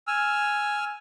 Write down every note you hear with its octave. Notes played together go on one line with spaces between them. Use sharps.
G#5 E6 F6